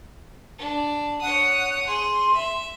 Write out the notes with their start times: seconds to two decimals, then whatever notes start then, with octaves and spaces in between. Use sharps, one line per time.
0.58 D4
1.21 C#5 F#5 D#6
1.87 G#4 C6
2.34 E5